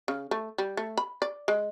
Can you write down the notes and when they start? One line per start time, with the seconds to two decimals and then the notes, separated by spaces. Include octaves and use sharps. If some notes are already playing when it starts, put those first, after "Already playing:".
0.08 C#3
0.31 A3
0.58 G3
0.77 A3
0.97 B5
1.22 D5
1.48 G#3